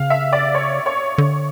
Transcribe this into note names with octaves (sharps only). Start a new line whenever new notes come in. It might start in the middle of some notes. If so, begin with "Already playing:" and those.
Already playing: C#3 F5
E5
D5
C#5
C#5
D3